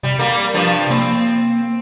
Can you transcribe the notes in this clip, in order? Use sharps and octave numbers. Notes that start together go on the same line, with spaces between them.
C3 G3
G3 A#3
G2 F3
A#3 C4